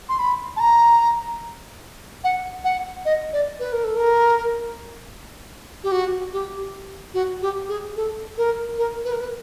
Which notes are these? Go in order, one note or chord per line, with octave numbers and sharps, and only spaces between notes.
C6
B5
A5
A#5
F#5
F#5
D#5
D5
B4
A#4
A4
A#4
G4
F#4
G4
F#4
G4
G#4
A4
A#4
A#4
B4
A#4
B4